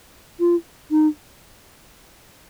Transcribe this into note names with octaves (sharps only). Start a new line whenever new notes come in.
F4
D#4